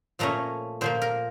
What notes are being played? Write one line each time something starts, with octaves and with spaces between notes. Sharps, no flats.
A#2 F3 A3 C#4 A#5
A#2 F3 A#3 C5
A#4